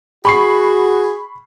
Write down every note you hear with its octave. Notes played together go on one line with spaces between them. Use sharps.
F#4 G#4 B5 C#6 C7